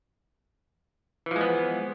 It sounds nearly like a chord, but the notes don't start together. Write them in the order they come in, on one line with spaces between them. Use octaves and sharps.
E3 F3 G#3 B3